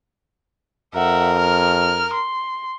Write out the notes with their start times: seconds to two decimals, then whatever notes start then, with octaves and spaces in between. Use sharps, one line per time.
0.95 F2 A#4 E5 F#5
1.38 F6
2.14 C6